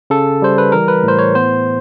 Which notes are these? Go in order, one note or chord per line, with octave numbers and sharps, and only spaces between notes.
C#3 A4
G3 C5
B4
E3 A#4
B4
A2
C5
C#5
B3 C5